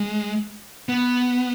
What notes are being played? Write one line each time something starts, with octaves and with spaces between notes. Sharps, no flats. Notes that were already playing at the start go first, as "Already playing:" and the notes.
Already playing: G#3
B3